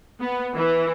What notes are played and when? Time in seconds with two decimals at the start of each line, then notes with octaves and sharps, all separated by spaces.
0.20 B3
0.55 E3